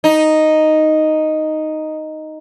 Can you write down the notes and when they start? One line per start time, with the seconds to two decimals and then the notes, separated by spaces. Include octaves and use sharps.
0.04 D#4